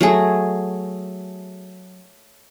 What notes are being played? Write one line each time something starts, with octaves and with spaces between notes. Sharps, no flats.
F#3 A3 G#4